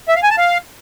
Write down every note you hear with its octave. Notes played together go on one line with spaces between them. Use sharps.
E5
F5
G#5
A5
F5